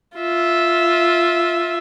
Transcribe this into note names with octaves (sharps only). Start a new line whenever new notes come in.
F4 E5